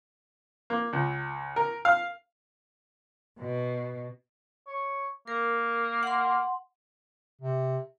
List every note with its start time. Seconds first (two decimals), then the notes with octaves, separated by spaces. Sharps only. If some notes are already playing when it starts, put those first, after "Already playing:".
0.70 A#3
0.93 C#2
1.56 A#4
1.85 F5
3.39 B2
4.67 C#5
5.27 A#3 A#4
6.03 F#5 C6
7.41 C3